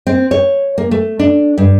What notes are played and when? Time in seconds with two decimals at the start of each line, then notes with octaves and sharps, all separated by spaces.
0.07 C4
0.31 C#5
0.78 A#3
0.91 A3
1.19 D4
1.58 G2